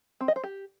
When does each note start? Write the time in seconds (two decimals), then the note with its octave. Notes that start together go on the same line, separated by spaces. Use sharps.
0.21 C4
0.28 D#5
0.36 C5
0.44 G4